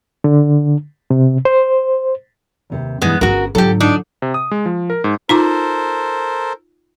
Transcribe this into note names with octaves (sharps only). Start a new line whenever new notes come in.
D3
C3
C5
D#2 C3 B4
G2 B2 E3 G#3 B3
G1 C#4 F#4 G#4 A#4 B4
G#2 D3 F#3 F4 G4 A4
D4 D#4
C3
D#6
G#3
F3
A#4
G#2
D#4 F4 A4 A#4 C5 D6